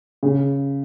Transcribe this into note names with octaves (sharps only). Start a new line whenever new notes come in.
C#3